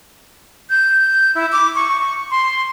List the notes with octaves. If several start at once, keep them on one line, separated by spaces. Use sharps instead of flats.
G6
E4
D6
C#6
C6